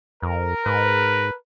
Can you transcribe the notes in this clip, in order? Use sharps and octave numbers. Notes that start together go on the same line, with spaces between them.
F2 A#4
G#2 B4